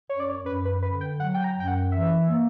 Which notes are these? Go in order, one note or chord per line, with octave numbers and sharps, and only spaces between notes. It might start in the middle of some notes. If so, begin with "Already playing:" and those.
F#2 C#5
D5
C#5
F#2 B4
B4
D3 B4
G5
F#3 F#5
G5
A#5
F#2 G5
F#5
E3 E5
A#3